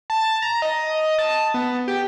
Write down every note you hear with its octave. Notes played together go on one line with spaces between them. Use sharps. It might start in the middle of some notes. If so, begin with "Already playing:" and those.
A5
A#5
D#5
A5
B3
G4